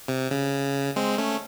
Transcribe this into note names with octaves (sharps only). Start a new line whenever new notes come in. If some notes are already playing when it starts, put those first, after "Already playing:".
C3
C#3
G#3 C4
A3 C#4